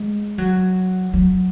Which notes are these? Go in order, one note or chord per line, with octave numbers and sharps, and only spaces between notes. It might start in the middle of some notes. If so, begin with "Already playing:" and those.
Already playing: G#3
F#3
F#3